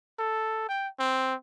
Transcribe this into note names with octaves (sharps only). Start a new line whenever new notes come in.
A4
G5
C4